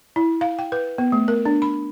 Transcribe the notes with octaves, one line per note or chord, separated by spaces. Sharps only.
E4
F5
G5
B4
B3
A3
A#4
D4
B5